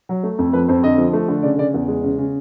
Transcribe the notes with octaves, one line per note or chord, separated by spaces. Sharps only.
F#3
A3
F2
F3 B4
F2 C5
D3 D#5
F3
A3
D3
C#3 D5
C#3 D5
E2
G#3
C#3
C#3